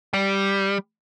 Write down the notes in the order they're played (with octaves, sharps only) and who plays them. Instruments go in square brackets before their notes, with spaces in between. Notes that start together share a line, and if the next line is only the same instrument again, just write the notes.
[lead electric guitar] G3